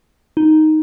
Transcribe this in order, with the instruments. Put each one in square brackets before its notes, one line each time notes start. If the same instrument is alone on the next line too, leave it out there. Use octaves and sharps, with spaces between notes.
[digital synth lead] D#4